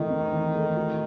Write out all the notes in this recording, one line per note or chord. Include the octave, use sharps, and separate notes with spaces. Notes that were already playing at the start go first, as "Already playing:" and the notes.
Already playing: D#3 E3 A3 C4 E4
C4
E3
A3
F#4